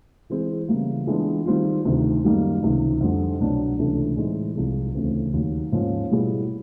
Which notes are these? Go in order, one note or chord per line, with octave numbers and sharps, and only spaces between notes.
E3 G#3 C4 E4 G#4
C#3 E3 G3 A#3
E3 G#3 B3 D4 F4
D#3 G3 C4 F4
D2 C3 D#3
F#2 D#3 G3 A#3 D#4
C#2 C3 D#3
F2 D3 G3
C2 B2 F#3 B3 D4
C#2 C3 E3 A3 D4
A2 E3 G#3 C4 D#4
C2 C3 F3 G#3
D2 C#3 E3 A3 C4
D#2 D#3 F#3
G#2 F3 A#3 C#4 F4
B2 G3 B3 E4 G#4